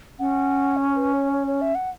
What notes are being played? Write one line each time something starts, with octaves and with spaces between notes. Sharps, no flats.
C#4 F#5
C#5
B4
C#5
C#5
C#5
E5
F#5